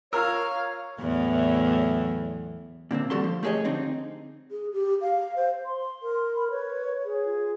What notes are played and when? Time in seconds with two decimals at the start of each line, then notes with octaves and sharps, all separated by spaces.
0.13 F4 A#4 C#5 F5 A#5 E6
1.00 E2 A2 F#3
2.91 A#2 D3 A#3 C4
3.10 E2 G3 F#4 A4 C6
3.24 F3
3.43 A3 G4 G#4 B4 C#5 D#5
3.64 F2 D3 C4 D#4
4.51 G#4
4.73 G4
5.01 F5
5.36 C5
5.66 C6
6.03 A#4
6.36 B5
6.51 B4 C#5
7.05 G#4
7.25 F4